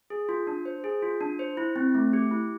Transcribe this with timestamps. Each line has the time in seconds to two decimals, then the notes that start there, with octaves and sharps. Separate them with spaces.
0.10 G#4
0.29 F4
0.47 D4
0.65 C5
0.84 G#4
1.02 F4
1.21 D4
1.39 C5
1.57 E4
1.76 C4
1.95 A3
2.13 G4
2.31 E4